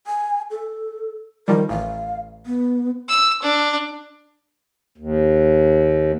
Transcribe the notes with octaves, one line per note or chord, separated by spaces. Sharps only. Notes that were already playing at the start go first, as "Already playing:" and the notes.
G#5
A4
D#3 F3 G3 A#4
A1 F5
B3
E6
D4
D#2